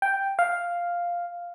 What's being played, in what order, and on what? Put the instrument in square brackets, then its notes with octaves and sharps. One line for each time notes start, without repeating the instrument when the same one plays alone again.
[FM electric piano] G5
F5